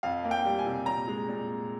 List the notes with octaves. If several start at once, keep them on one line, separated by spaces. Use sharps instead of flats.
F2 F5
A#3
G5
G3
G#5
C3
A#2 A#5
G#3
A#2